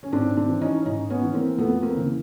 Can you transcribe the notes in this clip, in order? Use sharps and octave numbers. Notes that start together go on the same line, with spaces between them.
C#4
G#2 C4 D4
C4 D4
E3
C#4 D#4
G#2 C#4 D#4
B3 C#4
E3
A#3 C4
F2 A3 B3
A#3 C4
C#3 E3